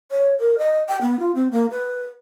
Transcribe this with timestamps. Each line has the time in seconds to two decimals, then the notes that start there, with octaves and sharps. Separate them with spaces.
0.11 C#5
0.40 A#4
0.58 D#5
0.88 G5
1.01 B3
1.19 F4
1.35 C4
1.51 A#3
1.71 B4